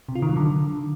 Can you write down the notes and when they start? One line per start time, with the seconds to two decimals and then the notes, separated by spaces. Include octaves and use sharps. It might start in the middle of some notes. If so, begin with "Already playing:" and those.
0.08 C3
0.15 F4
0.22 D#3
0.29 F#3
0.36 D3